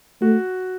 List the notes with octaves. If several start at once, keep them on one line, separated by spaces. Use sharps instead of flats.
A3 F#4